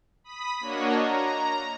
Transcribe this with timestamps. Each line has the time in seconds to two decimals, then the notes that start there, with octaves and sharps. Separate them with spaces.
0.24 B5 D#6 B6
0.60 A#3 D4 F#4 C#5 D#5
0.96 A#5